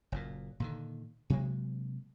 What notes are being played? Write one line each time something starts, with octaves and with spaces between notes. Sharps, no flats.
F#1 F#2 A#2
A#2 D3 D#3
C3 F#3 G#3 A#3